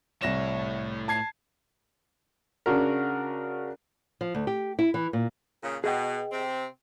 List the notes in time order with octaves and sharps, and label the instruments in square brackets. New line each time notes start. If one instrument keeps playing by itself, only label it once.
[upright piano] C2 A#6 E7 [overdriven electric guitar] A2 C#5
[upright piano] A5 G#6 C7
[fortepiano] C#3 D4 F#4 A#4
[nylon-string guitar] F3
D2
G4
E4
E3
A#2
[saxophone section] A#2 C#3
[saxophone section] B2 [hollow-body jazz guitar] G#4 D#5 G5
[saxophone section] C3 C4